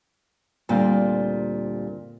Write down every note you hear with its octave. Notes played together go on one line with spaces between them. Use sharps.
D2 A#2 G3 C4